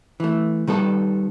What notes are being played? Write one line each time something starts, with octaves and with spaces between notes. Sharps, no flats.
E3 A3
D#3 G3 B3 A4